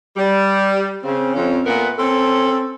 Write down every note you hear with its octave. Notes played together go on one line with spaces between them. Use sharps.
G3
C#3 C4
F2 C#4
A#2 A3 B3 A#4 B4
C4 C#4 A4